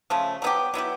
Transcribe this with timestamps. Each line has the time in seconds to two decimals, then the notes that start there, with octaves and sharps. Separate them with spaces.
0.10 C#3 F3 A3
0.42 F#3 B3 E4 G4
0.74 F#3 B3 E4 G4